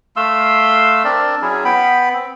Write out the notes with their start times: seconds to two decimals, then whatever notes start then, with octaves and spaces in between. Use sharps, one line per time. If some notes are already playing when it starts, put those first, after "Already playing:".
0.16 A3 F5 C6 E6
1.04 C4 D4 A#4 D5
1.42 F#3 C#4 E4 G#4
1.65 B3 G5 B5
2.13 C4